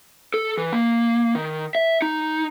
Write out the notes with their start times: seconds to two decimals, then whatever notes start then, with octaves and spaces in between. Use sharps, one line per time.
0.34 A4
0.58 E3
0.73 A#3
1.35 D#3
1.75 E5
2.02 D#4